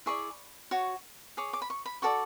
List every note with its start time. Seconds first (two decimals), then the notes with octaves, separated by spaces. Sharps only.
0.06 E4 G#4 D5 C#6
0.71 F#4 C#5
1.37 G#4 C#5 D6
1.53 D6
1.62 B5
1.70 C#6
1.86 B5
2.02 F#4 A4 D5 C#6